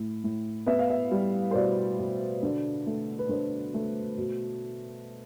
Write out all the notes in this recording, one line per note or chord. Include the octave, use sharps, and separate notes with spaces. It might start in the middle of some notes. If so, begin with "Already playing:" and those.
Already playing: A2
A2
B3 E5
F5
E5
G3
C5
B2 D5
B2
D3
A3
B4
D3 C5
A3
B2